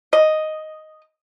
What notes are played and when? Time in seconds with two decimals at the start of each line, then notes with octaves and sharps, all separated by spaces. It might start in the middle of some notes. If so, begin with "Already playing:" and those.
0.13 D#5